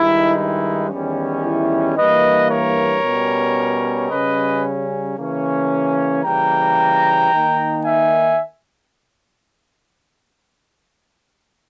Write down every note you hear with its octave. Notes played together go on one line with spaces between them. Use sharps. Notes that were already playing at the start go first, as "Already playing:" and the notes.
Already playing: G2 D#3 G#3 D#4 E4
E4
E2 D#3 G3 C#4
E4
G2 E3 A#3 B4 D#5
A#4 C#5
B2 G3 C#4
C#3 G3 C#4 B4 D#5
C#3 E3 A#3 C#4
C#3 E3 G3 A#3 G5 A#5
D#3 A#3 D#4
E5 G#5